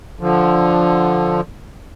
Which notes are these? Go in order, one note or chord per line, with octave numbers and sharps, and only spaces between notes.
D3 F3